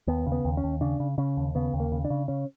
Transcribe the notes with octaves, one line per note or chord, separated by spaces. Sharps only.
D#2 B3
C#3
B3
D#2
C#4
D#2
C#3 D4
C#3
C#3 C#4
D#2
C#3 B3
D#2
A#3
C#3
D4
C#3
C#3 C#4